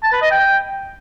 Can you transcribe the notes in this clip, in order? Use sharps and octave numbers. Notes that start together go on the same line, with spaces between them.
A5
B4
D#5
G5